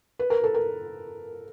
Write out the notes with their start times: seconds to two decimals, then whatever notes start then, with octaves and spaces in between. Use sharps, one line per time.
0.19 B4
0.30 A#4
0.44 A4
0.54 A#4